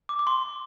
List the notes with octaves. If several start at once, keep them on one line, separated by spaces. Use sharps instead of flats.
D6
D6
C6